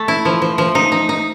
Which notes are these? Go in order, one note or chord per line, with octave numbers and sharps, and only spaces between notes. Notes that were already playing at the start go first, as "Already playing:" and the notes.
Already playing: A3
E4
F3
F3
F3
D#4
D#4
D#4